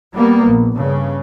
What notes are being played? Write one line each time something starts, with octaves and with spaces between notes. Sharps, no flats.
G3 A#3 B3
A#1
G2 C#3